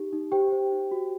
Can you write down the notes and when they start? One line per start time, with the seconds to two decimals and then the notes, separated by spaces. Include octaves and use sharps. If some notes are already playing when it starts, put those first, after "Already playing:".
Already playing: D#4 G4
0.13 D#4
0.32 G4 C5 G5
0.52 C5
0.72 D#4
0.91 F#4